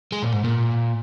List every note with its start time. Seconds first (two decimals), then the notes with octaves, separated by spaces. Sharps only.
0.12 G#3
0.23 A#2
0.33 G#2
0.44 A#2